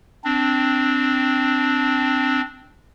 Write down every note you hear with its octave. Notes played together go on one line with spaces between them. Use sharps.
C4 D4